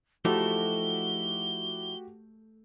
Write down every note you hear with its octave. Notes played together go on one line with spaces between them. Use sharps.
F3 A3 D#4 E4 F#4 G4 G7